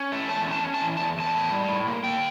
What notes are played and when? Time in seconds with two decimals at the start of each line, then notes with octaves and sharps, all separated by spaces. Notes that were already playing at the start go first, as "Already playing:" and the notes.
Already playing: C#4
0.12 A3
0.29 E2 A5
0.47 C#4 A5
0.64 C#4
0.74 A5
0.81 E3
0.97 E2 A5
1.17 E2 A5
1.34 A2
1.52 G3
1.69 A2
1.87 A#3
2.04 A#3 G5